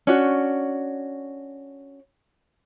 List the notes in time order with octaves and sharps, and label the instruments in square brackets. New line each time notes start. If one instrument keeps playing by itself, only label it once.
[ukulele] C#4 D4 F#4